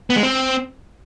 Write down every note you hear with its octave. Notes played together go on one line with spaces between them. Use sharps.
B3
G#3
C4